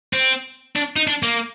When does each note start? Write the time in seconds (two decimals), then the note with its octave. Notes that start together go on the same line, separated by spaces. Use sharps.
0.13 C4
0.76 D4
0.96 D#4
1.07 D4
1.23 A#3